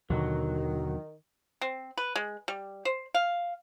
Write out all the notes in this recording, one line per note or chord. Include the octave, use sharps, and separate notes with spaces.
D#2 B2 D3 D#3 F#3
C4
B4
G#3
G3
C5
F5